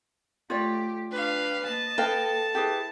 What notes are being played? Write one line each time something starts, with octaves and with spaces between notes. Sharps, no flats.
A3 F4 G4 C#5 D5
D4 G4 B4 F5
A#3 D#5 A5
A4 B4 F5 G5
E4 G4 G#4 B4